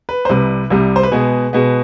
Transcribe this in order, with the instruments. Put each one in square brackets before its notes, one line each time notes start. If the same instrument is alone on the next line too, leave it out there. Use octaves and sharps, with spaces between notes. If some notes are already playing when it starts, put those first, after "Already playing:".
[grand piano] B4
C5
C2 C3 G3 B4
C2 C3 G3
C5
B4
B2 G#3 B3 G#4
B2 G#3 B3